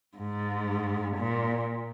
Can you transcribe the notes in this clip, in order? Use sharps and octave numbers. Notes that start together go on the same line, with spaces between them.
G#2
A#2